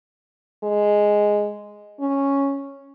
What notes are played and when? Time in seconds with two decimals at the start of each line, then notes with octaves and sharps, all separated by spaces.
0.64 G#3
2.00 C#4